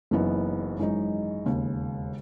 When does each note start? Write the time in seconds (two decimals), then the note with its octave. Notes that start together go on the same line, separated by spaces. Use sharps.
0.11 F#1 F#2 E3 B3 D#4
0.78 G#1 F#2 E3 G#3 D#4
1.46 E1 D#2 C#3